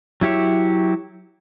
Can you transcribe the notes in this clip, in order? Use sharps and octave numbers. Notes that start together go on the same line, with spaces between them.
F#3 E4 G4 C#5 E5